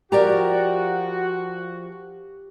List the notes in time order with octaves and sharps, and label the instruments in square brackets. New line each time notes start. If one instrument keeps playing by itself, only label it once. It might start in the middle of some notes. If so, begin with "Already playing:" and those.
[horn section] F3 F#4 [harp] G4 [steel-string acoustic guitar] A#4 D5 A#5